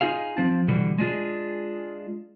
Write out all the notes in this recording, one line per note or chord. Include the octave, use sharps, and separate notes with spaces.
D#4 F4 G#4 F5
F3 C4 A5
B2 D3 E3 G3
G#3 D4 F4 G#4